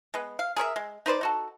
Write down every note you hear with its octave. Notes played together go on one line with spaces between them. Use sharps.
G#3 B3
F5
G#4 A#4 C#5 E5
G#3
D#4 B4 C5 D5
D#4 F#4 A4